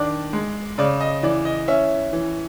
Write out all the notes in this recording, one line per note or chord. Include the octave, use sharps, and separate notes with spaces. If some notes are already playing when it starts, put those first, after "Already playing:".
Already playing: D#3 D4 D5
G#3
C#3 D5
D#5
E3 D5
D#5
C#4 E5
E3